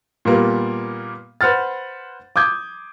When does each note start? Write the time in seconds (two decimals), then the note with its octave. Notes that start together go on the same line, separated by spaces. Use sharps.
0.25 A#2 G3 A#3 B3
1.41 B4 C5 F#5 F6 A6
2.36 D6 D#6 G6 G#6